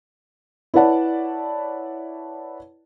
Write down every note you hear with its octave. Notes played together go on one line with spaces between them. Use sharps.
E4 B4 C#5 D5 F#5 A5